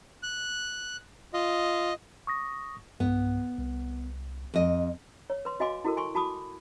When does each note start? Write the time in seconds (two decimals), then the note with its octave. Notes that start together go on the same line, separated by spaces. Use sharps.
0.23 F#6
1.34 F4 D#5
2.27 C#6 D#6 A#6
3.00 B1 G2 B3
3.58 C2
4.54 F2 D#5
5.30 C#5
5.45 B4 C6
5.60 F#4 D#5 F5 G#5 C6 D6
5.85 E4 F#4 A4 A#4
5.97 G#5 C6 C#6
6.15 F#4 A5 B5 D6 D#6